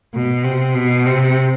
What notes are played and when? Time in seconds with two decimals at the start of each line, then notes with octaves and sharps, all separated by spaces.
0.14 B2
0.44 C3
0.75 B2
1.06 C3